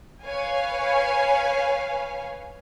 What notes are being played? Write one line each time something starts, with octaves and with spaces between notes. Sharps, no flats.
B4 C#5 F5 G#5